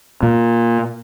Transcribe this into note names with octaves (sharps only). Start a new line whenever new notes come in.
A#2